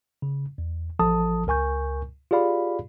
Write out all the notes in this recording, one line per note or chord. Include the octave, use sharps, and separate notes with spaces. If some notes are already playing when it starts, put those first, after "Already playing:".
C#3
E2
A1 F3 A4 A5 D#6
C#2 A#4 G#5 C#6 G6
F4 G4 G#4 D5 F5 B5